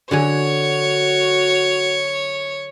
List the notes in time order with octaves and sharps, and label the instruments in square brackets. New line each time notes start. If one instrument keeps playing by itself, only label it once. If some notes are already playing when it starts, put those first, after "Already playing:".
[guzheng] D3 F#3 G#5 [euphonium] F#4 [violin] C#5